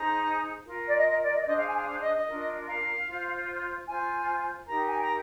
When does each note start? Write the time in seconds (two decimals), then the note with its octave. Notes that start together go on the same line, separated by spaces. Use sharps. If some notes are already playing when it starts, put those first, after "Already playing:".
Already playing: D#4 G#4 C5 A#5
0.66 F4 A#4
0.87 D5
0.97 D#5
1.07 D#5
1.21 D5
1.33 D#5
1.41 D5
1.46 D4 G#4 C5 D#5
1.57 F5
1.67 G#5
1.77 F5
1.87 F5
2.01 D#5
2.14 D#5
2.27 D4 F4 A#4
2.68 F5
3.07 F4 C5
3.87 F4 C5 G#5
4.67 D#4 G4 A#4 A#5
4.88 G#5
5.01 A#5